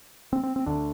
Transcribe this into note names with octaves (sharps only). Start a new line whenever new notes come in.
C4
C4
C4
D2 D3 D4